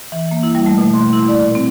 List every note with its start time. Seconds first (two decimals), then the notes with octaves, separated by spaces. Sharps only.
0.12 E3
0.31 A#3
0.43 E4
0.55 G3
0.66 A3
0.78 B2
0.94 C6
1.13 E4
1.28 D5
1.41 A#2
1.55 C4